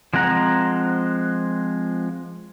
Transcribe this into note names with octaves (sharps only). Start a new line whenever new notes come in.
F3 G#3 C4 F#5 A#5